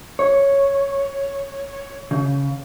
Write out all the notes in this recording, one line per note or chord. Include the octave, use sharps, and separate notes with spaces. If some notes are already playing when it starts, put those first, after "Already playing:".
C#5
C#3